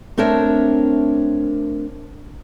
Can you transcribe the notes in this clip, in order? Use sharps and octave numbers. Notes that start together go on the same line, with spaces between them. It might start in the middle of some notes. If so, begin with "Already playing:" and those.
A3 C4 D4 A#4 C#5 E5